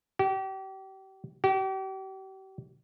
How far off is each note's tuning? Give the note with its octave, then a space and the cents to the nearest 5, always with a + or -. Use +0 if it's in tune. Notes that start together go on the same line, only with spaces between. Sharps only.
G4 -35
G4 -40